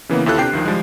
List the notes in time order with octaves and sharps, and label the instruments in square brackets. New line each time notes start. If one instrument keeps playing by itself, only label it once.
[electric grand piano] C#3 E3 A#3 B3
D#2 E4 F4 A4 F#6
C3 D4 G4 G5 C7
D2 D#3 F3
F3 G3 G#3